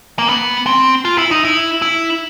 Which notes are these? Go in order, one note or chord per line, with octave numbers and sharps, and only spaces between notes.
A#3
B3
C4
F4
E4
D#4
E4
E4